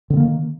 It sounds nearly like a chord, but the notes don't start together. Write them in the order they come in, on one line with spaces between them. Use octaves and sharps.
D3 C4 A#3 D#3